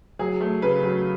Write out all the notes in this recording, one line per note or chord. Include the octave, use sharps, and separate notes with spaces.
F#3 G#4
A3
C#3 B4
F#3